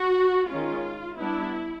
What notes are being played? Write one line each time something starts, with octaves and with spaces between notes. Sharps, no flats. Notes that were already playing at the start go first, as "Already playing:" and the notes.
Already playing: F#4
D#3 G#3 C#4 F4
G3 B3 D4 E4